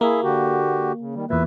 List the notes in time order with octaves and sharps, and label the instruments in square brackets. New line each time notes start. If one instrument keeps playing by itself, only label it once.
[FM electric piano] A#3 [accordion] E4 G#4 E5
[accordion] D3 F#4 G4
C#3
D#3 G3
[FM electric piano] E2 A#2 [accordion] B4 E5